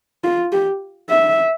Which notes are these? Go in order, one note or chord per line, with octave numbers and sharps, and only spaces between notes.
F4
G4
E5